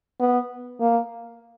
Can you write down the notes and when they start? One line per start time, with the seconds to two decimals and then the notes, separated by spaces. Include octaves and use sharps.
0.20 B3
0.80 A#3